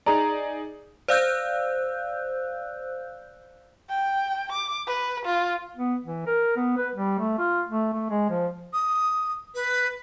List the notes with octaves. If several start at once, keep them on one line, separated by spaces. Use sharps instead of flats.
D#4 G#4 D5 A#5
C5 D5 F5 E6 F#6 G6
G5
D6
B4
F4
B3
E3
A#4
B3
B4
G3
A3
F4
A3
A3
G#3
F3
D#6
B4